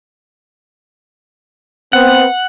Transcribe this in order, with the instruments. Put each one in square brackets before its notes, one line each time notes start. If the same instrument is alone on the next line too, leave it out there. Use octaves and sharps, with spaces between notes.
[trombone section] B3 C4 [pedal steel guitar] F#5